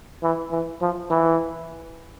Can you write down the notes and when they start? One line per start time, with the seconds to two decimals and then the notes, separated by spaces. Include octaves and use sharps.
0.23 E3
0.51 E3
0.81 F3
1.10 E3